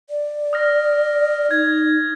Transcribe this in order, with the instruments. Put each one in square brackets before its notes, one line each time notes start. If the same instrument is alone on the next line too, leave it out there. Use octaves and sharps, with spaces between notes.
[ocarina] D5
[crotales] D#6 F6 A#6
[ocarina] D#4 [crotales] G#6